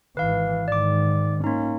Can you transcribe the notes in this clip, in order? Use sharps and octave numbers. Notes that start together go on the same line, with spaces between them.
G#1 E3 B4 F5
G#2 D#3 D5 D6
A#3 C#4 D#4